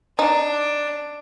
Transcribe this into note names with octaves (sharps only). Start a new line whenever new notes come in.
D4 D#4